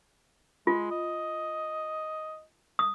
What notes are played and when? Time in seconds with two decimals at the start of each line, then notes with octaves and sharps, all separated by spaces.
0.67 G#3 F4
0.91 D#5
2.79 D#6